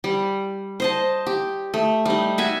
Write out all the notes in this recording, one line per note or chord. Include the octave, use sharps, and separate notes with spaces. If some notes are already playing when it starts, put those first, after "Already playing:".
G3
C5 D#5 A5
G4
A3
G3 D#4
F#4 E5 G#5